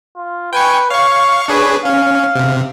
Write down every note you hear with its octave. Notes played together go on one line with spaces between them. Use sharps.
F4
B4 G5 G#5 C#6
C#5 F5 C#6
D4 G#4 B4 C#5
C#4 F5
C3